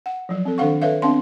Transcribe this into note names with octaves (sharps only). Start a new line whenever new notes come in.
F#5
F3 F#3
C4 A4
D#3 D4 A4 F5 F#5 C#6
A4 B4 C#5 E5 F5
B3 C4 D4 F5 C6